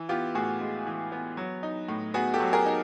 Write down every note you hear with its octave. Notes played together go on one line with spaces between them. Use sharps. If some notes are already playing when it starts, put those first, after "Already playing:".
Already playing: E3
B3 F4 G4
A2 F#4 G#4
G#3
E3
B3
F#3
D#4
A2
B3 F#4 G#4
G4 A4
F#3
G#4 A#4
D#4